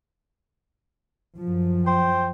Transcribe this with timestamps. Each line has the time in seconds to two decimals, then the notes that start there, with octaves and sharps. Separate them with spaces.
1.37 F#2 F3
1.86 C5 G5